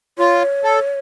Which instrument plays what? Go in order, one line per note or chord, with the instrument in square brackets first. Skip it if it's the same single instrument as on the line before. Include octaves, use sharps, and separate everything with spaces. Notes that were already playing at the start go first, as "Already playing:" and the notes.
[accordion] F4 [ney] C#5
[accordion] A4